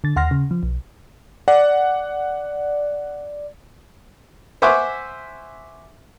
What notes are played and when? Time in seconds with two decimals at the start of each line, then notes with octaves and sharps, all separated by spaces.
0.04 D3 A6
0.16 D#2 F#5 C6 F6 A#6
0.31 C#3
0.51 F3
0.63 B1
1.48 D5 F#5
4.62 C5 E5 F#5 G#5 C#6 D6